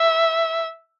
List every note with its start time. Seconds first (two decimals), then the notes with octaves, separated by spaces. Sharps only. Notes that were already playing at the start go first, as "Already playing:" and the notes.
Already playing: E5